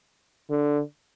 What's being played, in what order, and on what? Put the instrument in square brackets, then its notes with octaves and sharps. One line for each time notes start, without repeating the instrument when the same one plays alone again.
[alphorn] D3